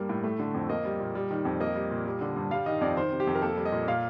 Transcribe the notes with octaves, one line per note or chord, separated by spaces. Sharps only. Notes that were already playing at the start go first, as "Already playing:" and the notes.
Already playing: G2 G3 A#3
A2
A3
D3
F2
A#3 D#5
G3
A#2
G3
D#3
F2
A#3 D#5
G3
A#2
G3
D3
G2
G3 F5
D#3 D#5
F2 D5
D#3 C5
C3
G4
F2
A#4
A#3 A4
G3
D#5
A#2
A#2 F5